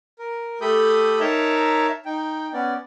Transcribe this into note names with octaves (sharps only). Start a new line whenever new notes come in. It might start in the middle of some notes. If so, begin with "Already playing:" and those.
A#4
A3 G4 A4 B5 D#6 G6
D#4 A#4 C#5 E5 A5 A#5
D#4 G5
B3 C#4 D5